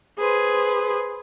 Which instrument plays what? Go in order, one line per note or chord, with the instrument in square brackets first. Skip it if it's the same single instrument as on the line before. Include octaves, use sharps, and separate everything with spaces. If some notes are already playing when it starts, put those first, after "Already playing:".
[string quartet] G#4 B4 C5